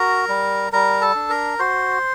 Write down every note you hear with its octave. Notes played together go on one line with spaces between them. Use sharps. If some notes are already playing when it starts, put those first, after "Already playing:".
Already playing: F#4 A#4 A#5
G3
G3 A#4 A#5
A4 A5
D4
A#4 A#5
F#4 C5 C6